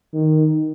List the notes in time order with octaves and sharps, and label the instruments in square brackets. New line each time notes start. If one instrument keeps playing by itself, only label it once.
[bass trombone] D#3